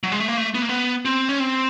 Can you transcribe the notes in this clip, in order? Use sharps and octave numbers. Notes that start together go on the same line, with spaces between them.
F#3
G#3
A3
A#3
A3
B3
A#3
B3
C4
C#4
C4